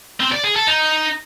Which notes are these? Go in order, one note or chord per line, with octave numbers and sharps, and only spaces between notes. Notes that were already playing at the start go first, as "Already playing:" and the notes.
C4
D5
G#4
A4
D#4